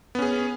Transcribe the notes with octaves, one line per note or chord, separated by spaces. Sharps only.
B3 C#4 G#4